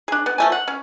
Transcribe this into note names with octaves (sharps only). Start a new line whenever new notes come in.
D4 G#4
B3
F3 A3 G#5
F#5
C#4